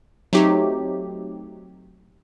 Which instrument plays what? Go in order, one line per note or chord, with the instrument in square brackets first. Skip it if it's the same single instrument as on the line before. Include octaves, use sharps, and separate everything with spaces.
[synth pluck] F#3 A3 C4 D#4 G4